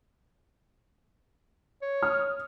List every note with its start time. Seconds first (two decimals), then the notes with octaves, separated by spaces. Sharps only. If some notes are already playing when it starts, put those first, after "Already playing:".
1.82 C#5
2.02 D#6 F6